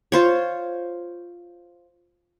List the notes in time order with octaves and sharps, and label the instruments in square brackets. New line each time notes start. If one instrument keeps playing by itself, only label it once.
[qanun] F4 C5 C#5